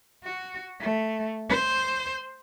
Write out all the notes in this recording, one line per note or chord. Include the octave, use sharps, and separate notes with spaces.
F#4
A3
C5